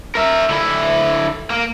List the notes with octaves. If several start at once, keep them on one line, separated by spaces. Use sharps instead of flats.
A#4 E5
D3 E4
A#3